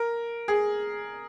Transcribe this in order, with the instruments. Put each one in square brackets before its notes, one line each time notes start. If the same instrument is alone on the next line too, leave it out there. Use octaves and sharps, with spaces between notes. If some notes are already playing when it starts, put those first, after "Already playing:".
Already playing: [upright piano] A#4
G#4